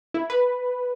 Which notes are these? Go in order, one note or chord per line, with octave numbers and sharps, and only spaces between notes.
E4
B4